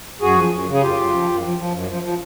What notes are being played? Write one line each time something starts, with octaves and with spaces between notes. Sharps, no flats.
F#2 F#4 G#4
F3
F#2
C#3
G#4
F#2 F4 G4
F#2
F3
F#2
F3
F3
F#2
F3
F3